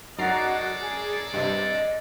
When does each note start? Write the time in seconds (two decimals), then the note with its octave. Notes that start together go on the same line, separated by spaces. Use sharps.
0.18 F#2 G#3 D#4 F#4 A4 D5 A#5 C7
0.80 G#4
1.34 G2 C3 D#5